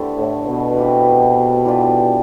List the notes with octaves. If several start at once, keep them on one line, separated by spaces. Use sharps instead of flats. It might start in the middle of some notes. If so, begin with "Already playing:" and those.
Already playing: D3 A3 B3 D4 E4 G4 C5
A2
B2
E3 G3 C4 E4
E3 G3 D4 F4